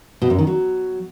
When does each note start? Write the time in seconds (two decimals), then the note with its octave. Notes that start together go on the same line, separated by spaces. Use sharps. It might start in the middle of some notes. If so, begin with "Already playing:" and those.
0.22 B2
0.30 F#2
0.38 D#3
0.47 F#3